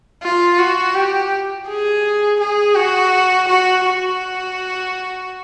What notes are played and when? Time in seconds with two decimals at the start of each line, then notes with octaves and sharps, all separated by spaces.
0.23 F4
0.59 F#4
0.95 G4
1.68 G#4
2.40 G#4
2.76 F#4
3.48 F#4
3.85 F#4